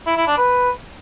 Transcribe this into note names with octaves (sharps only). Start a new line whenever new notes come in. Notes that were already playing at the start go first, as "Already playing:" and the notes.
E4
E4
D4
B4